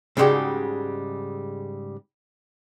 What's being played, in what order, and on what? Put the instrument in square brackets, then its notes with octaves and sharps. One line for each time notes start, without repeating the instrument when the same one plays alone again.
[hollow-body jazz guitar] G#2 C#3 G3 G#3 F#4 G4